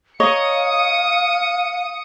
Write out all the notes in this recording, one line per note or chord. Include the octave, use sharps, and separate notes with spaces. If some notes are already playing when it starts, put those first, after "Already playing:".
C#5 D#5 F5 A#5 D#6 C#7